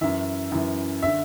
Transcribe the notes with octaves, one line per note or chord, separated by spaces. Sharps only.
F#2 E3 E5
F#2 E3
D3 E5